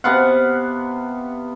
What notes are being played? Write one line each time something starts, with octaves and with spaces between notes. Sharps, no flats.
C3 B3 F5 F#5